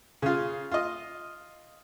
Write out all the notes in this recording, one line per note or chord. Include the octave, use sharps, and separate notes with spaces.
C#3 F4
F4 D#5